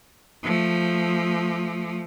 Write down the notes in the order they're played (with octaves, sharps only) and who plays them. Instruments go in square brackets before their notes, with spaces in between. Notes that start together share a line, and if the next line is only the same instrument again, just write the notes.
[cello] F3 A3